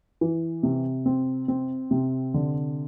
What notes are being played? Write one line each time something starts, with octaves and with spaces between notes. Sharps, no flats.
E3
C3
C4
C4
C3
D3